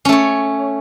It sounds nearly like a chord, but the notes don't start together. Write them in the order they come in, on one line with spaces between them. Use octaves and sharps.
C#4 A3 C#5